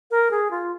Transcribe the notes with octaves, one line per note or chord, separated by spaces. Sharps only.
A#4
G#4
F4